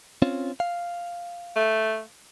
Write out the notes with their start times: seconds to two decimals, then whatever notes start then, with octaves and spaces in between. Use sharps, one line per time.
0.22 C4 C#4 F4
0.60 F5
1.56 A3